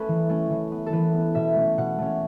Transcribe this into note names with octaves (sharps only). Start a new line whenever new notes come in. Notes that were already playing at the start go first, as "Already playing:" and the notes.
Already playing: A3 C#4 A4 B4
E3
A3 C#4
E3
B3
A4
E3 B4
B3
B2 E5
A3 C#4
B2 F#5
A3 C#4